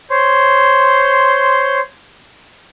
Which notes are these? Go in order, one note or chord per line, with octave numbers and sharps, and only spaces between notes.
C5 C#5 C6